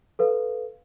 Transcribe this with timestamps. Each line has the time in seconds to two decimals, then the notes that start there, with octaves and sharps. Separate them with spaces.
0.19 A4 B4 F5